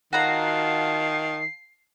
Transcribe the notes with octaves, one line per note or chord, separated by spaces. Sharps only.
D#3 F4 F#4 A5 A#5 C7